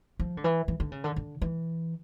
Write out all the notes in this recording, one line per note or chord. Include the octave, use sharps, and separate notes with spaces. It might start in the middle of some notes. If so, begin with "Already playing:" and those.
F3
D3
E3
E3
D3
C#3
D3
D3
E3